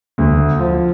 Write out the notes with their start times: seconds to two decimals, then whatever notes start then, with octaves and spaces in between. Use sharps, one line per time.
0.18 D2
0.59 F3